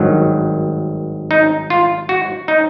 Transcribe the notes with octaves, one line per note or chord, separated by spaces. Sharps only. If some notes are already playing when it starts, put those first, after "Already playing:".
Already playing: G#1 G2 D#3 F#3
D#4
F4
F#4
D#4